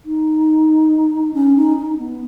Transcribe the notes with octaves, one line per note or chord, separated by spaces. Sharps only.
D#4
C#4
D#4
D#4
B3